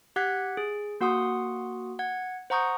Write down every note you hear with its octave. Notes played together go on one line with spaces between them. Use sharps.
G4 F#5 F#6 G#6 B6
G#4
A#3 F#4 F#5 C6 D#6
F#5 G#6
C5 F#5 A#5 C#6 D#6 G6